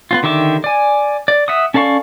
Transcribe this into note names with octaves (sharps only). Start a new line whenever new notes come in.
B3 C4 F4
D3 D#3 G4 E5 D6
D5 G#5
D5
E5 F#5 D#6
C#4 A4 D5 F5 C#6